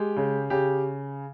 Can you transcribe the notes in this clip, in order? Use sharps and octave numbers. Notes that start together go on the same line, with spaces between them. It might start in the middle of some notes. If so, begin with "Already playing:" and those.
Already playing: G#3 G4
C#3
C#3 G4